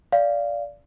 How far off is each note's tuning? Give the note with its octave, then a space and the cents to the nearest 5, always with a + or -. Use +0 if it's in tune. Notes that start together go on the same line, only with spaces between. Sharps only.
D5 -15 F5 -10